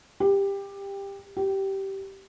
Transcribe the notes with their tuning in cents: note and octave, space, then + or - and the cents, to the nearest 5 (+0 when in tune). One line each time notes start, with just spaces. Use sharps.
G4 +15
G4 -15